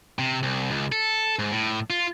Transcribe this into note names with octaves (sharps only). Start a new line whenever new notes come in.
C3
C2
C#2
A4
G#2
A2
F4